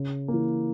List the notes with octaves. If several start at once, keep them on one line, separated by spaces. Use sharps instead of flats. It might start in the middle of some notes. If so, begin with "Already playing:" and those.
Already playing: C#3
E3 A#3